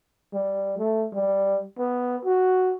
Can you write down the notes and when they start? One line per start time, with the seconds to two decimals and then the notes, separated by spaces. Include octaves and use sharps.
0.33 G3
0.78 A3
1.13 G3
1.78 B3
2.25 F#4